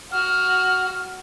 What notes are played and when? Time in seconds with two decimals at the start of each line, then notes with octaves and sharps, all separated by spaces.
0.12 F#4 F6